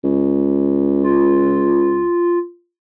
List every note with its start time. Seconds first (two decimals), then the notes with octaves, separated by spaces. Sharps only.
0.04 C#2
1.03 F4